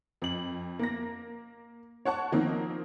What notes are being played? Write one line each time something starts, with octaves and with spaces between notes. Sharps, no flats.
F2 F#7
A#3 A#6
C#5 F#5 A5 C#6
D#3 F3 A#3 C4 D#4